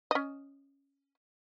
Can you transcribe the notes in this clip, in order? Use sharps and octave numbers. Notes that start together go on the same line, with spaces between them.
C#4 D#5